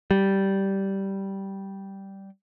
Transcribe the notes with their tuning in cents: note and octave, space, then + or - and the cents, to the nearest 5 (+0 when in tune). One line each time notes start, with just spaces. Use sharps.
G3 -10